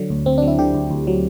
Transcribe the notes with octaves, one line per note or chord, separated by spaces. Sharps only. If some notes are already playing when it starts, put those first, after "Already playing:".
Already playing: D3 F#3
D2
D2 C4
D4
F#3
E4
D3 G4
D2
D2
F#3